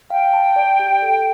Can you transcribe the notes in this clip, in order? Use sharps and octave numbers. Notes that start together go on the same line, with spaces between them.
F5 G5
A5
D5
G4
A4